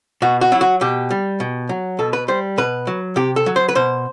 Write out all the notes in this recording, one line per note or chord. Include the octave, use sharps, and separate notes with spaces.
B2 F#4
F#4
F#3 E4
F#4
B2 G4
G3
B2
F#3
B2 A4
B4
G3 C5
B2 B4
F#3
C3 G4
A4
F#3
C5
B4
B2 C5